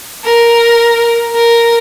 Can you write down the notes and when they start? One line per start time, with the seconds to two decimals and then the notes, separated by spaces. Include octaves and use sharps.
0.24 A#4
1.35 A#4